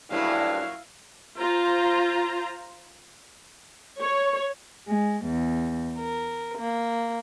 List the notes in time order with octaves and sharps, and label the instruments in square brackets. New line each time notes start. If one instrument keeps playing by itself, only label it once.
[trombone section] D2 G2 [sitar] A#2 F#3 C#4 [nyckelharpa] E4 F5
[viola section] F4 C5 A#5
C#5
[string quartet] G#3
E2
A#4
A#3